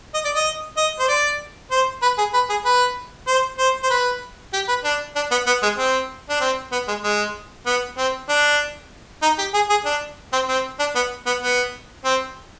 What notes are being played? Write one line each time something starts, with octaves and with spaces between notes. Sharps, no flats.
D#5
D5
D#5
D#5
C5
D5
C5
B4
G#4
B4
G#4
B4
C5
C5
C5
B4
G4
B4
D4
D4
B3
B3
G#3
C4
D4
C4
B3
G#3
G#3
B3
C4
D4
D#4
G4
G#4
G#4
D4
C4
C4
D4
B3
B3
B3
C4